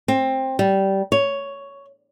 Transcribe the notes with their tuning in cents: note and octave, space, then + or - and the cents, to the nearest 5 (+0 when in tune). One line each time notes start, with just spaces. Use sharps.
C4 +15
G3 -15
C#5 +10